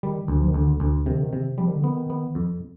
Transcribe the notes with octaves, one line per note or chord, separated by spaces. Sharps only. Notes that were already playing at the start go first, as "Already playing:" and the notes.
D#3 G3
D2
F3
D#3
D2 D3
D2
C3 D#3
D3
D#3
C3
F3 G3
D#3
D3
D#3 B3
B3
F2